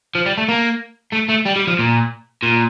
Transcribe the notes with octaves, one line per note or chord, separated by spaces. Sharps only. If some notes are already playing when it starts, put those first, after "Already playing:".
F3
G3
A3
A#3
A3
A3
G3
G3
F3
A#2
A#2